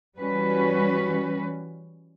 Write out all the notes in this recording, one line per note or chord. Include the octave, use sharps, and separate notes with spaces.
E3 G3 C#4 F#4 B4